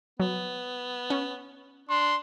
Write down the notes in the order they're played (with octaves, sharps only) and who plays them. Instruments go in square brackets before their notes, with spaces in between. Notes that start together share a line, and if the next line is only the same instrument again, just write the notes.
[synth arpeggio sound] F#3 [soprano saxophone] B3
[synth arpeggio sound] C#4
[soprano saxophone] D4 [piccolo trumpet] C6